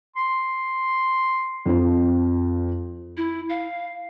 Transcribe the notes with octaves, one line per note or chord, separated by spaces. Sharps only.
C6
F2 F3 C4
E4
F5